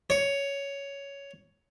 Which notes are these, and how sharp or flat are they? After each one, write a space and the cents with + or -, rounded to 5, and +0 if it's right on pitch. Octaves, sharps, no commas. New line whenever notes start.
C#5 +10